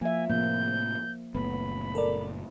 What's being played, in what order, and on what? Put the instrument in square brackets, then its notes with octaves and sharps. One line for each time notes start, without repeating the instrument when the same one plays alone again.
[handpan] F3 E5 [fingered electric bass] A#3 [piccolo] G#5
[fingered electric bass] A2 C3 F3 [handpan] A#3 [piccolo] G6
[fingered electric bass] F#1 A#2 A3 [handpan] B3 [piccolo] B5
[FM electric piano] A4 A#4 D5